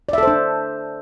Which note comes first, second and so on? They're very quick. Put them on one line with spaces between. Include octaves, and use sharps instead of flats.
D5 E5 A4 C5 D4